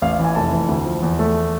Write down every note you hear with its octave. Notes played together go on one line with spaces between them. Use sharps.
A1 F5
F5
E3 G#5
F1 A5
E3
D2
F3
E2
A3